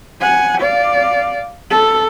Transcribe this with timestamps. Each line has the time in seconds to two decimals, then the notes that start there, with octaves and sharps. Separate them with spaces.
0.21 F#5 G#5
0.61 D5 F5
1.71 A4